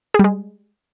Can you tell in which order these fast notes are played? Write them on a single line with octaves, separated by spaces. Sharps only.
G#4 G3 G#3